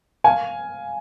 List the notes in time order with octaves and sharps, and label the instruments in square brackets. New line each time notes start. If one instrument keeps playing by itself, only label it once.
[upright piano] F5 G#5